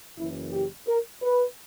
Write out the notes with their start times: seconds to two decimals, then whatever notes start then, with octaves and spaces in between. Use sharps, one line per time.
0.17 F#1 F#2 E3 E4
0.52 G4
0.87 A#4
1.22 B4